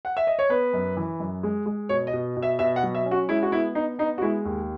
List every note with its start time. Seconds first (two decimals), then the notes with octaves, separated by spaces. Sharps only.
0.05 F#5
0.17 E5
0.27 D#5
0.39 C#5
0.49 B3 B4
0.73 F#2
0.97 E3
1.20 F#2
1.43 G#3
1.66 G#3
1.89 B2 C#5
2.07 D#5
2.13 B2
2.37 B2
2.42 E5
2.59 B2 E5
2.76 F#5
2.83 F#3
2.95 E5
3.06 C#4
3.11 F#4
3.29 G#3 E4
3.43 F#4
3.52 B3 E4
3.75 B3 D#4
3.99 B3 D#4
4.18 F#4
4.22 G#3 E4
4.45 D#2